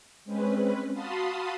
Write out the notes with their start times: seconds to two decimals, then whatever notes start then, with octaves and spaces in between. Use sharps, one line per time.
0.25 G#3 C4 C#4 B4
0.93 F#4 F5 A5 B5 C6 D#6